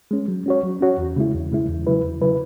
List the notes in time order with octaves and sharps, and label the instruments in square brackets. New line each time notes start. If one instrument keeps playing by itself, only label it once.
[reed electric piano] G#3 C#4
F#3
C#4 F#4 C#5
F#3
C#4 F#4 C#5
E2
C#3 G#3 E4
E2
C#3 G#3 E4
E2
C#3 F#3 E4 B4
E2
C#3 F#3 E4 B4